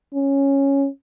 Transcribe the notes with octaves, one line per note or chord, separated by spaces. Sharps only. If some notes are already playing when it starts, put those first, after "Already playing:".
C#4